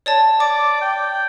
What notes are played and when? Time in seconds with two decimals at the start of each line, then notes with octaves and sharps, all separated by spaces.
0.06 C#5 D5 A5
0.40 D5 D6
0.82 G5